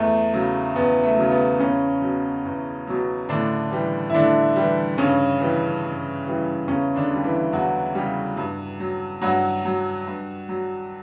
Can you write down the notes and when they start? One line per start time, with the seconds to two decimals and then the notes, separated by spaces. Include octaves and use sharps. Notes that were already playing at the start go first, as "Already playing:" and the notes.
Already playing: E2 A3
0.33 C#3 F#3
0.76 E2 B3
1.03 A3
1.17 C#3 F#3
1.31 B3
1.60 E2 C#3 C#4
2.02 B2 F#3
2.45 E2
2.87 B2 F#3
3.29 A2 D3 D4
3.71 E3 G3
4.10 E4
4.14 A2 D3 D4
4.56 E3 G3
4.98 G2 C#3 C#4
5.40 E3 G3
5.84 G2
6.26 E3 G3
6.68 E2 C#3 C#4
6.96 D3 D4
7.10 C#3 G3
7.24 E3 E4
7.52 E2 F#3 F#4
7.95 C#3 G3
8.37 G2
8.80 F#3
9.22 G2 F#3 F#4
9.65 F#3
10.07 G2
10.49 F#3